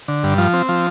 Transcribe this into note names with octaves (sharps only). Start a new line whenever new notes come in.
D3
G2
F3
C4
F3